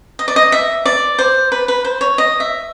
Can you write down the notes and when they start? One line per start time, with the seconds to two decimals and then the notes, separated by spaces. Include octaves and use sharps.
0.19 D#5
0.28 D5
0.36 D#5
0.52 E5
0.86 D5
1.19 C5
1.52 B4
1.68 B4
1.85 C5
2.01 C#5
2.18 D#5
2.40 E5